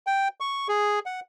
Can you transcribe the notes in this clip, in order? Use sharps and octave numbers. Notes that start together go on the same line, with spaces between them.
G5
C#6
G#4
F#5